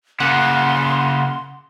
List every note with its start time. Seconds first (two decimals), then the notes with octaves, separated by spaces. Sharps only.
0.20 C#3 A#3 F#5 C6